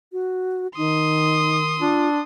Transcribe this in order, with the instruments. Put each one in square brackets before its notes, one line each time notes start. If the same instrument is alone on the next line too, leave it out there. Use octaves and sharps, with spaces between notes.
[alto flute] F#4
[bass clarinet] D#3 [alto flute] D#4 [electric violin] C6 D#6
[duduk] D4 [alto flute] F4